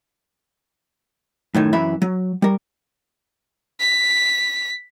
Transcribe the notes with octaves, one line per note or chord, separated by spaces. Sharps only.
F#2 A2 D#3
F#2 E3 E5 B5
F#3
G3 A#4
B6